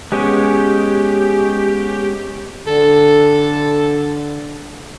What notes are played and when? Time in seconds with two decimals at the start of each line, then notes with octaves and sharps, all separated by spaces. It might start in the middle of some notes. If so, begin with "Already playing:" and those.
0.12 G#3 B3 C#4 G4
2.67 D3 A4